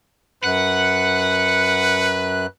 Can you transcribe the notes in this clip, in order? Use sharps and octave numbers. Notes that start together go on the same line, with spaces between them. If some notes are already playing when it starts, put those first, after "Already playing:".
F#2 B4 F#5 F#6